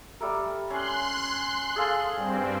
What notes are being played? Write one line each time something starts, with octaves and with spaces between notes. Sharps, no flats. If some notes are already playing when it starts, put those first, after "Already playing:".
G3 A3 A#4
C#4 C6 F#6
G#4 A4 F5
G2 C4